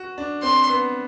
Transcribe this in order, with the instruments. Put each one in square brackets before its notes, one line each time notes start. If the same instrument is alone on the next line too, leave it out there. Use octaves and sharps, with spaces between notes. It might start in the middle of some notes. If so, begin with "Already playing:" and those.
Already playing: [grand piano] F#4
D4
[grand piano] C4 [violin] C6
[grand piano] B3